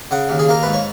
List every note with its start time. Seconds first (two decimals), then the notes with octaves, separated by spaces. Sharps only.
0.11 C#3 F#5
0.29 D#2
0.39 G#4
0.49 A#3 A#4
0.63 G#2 B4
0.73 C#5